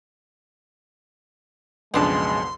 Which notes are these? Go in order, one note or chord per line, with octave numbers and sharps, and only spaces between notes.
B1 F2 C#3 G#3 B3 D4 A5 C6